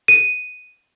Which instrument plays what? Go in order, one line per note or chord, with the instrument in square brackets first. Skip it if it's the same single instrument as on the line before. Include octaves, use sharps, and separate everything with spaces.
[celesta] D#7